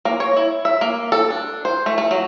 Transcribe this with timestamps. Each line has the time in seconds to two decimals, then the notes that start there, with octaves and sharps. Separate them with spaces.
0.05 A#3
0.20 C#5
0.37 E4
0.65 E5
0.81 A#3
1.12 A4
1.30 D4
1.65 C5
1.86 A3
1.98 A3
2.11 F#3